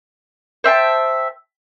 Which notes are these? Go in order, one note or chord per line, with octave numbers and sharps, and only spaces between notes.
C5 E5 G5 A5